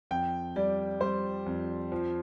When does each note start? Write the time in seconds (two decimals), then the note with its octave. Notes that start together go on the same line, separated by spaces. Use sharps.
0.11 F2 G5
0.56 G3 D5
1.01 G3 C5
1.46 F2
1.92 F3